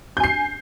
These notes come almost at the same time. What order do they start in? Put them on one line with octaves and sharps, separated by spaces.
G6 G#5 C7